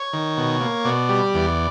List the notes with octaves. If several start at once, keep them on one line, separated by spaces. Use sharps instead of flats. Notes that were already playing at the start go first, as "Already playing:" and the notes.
Already playing: C#5
D#3
B2
A#3
B2 D5
G3
E2